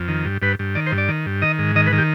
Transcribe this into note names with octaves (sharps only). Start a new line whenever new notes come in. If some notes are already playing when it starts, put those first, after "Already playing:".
Already playing: F2
D#3
G2
G2 B4
G2
D#3 D5
C5
G2
D5
D#3
G2
D#3 D#5
G#2
D#3 D#5
B4
D#3
G4